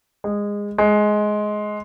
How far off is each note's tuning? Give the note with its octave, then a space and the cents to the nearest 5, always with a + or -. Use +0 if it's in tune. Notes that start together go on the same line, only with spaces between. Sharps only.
G#3 -20
G#3 +15